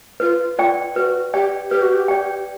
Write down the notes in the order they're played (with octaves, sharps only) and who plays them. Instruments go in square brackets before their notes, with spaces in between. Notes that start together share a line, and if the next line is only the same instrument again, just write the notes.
[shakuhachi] F4 [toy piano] B4
[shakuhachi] F4 [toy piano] D5 G5
[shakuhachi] F#4 [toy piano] B4
[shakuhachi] G4 [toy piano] D5 G5
[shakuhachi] G4 [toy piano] B4
[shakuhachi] F#4
G4
[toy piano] D5 G5